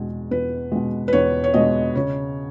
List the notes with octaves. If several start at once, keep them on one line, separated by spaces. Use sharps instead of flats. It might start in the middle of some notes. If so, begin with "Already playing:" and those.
Already playing: E2 B2 G#3
E2 B4
B2 G#3
B4
E2 C#5
C#5
B2 G#3 D#5
C#3 C#5